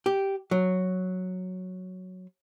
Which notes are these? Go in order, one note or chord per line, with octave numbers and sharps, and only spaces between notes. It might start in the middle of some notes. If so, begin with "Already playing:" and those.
G4
F#3